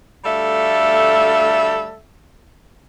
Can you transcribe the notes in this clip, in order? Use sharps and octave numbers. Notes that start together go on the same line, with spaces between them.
D2 G3 A3 A4 E5 F5